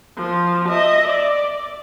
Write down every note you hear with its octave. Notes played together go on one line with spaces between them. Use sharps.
F3
D#5 E5
D5